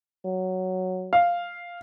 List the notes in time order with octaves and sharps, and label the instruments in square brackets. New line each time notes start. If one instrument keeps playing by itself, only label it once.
[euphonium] F#3
[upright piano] F5